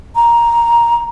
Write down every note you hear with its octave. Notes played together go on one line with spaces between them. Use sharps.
A#5